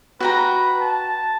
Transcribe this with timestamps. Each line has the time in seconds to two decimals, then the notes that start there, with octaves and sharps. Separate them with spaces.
0.20 F#4 B4 G5 A#5
0.81 A5